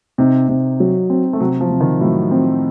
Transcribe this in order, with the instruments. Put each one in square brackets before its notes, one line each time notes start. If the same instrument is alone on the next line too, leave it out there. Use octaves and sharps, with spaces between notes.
[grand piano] C3 [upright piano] D#4
[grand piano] C3
F#3
C4
[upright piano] A3
[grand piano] C3 [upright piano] F#3
[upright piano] F3
[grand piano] C3
[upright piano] D#3
[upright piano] A2 [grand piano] F#3
[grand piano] C4